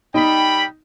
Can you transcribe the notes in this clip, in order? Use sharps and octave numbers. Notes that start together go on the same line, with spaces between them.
G3 D#4 G5 B5